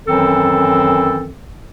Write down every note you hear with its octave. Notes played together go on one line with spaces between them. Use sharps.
F#2 D#3 E3 F#3 C4 A4